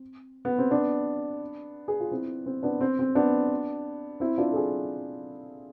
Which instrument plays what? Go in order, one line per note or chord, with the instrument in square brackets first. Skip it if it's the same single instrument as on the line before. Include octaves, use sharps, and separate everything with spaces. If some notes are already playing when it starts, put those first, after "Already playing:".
Already playing: [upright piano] C4
B3
C4
B3 D4
G#4
F4
C4 E4
C4
B3 D4
C4
C4
B3 D4
C4 E4
D4 F4
A4
E4 G#4